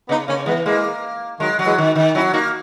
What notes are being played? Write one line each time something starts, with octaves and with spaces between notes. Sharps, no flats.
C#3 B3 D#4
C#3 A#3 C#4
E3 G#3 B3
E3 G#3 A#3
D#3 F#3 G#3
F#3
E3 G#3
D#3
D#3
F#3 C#4 E4
A#3 D#4 F#4